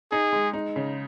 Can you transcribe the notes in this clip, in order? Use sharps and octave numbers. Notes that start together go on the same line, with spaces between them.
D#4 G#4
G#3
D#4
C#3